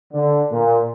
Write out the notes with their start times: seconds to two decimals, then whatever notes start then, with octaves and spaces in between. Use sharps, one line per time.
0.13 D3
0.51 A#2